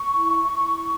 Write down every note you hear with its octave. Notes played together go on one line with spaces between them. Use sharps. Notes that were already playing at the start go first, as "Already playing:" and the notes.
Already playing: C#6
E4
E4